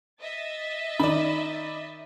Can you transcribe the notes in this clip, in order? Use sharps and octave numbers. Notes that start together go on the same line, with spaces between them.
D#5 E5 A6
D#3 D5 B5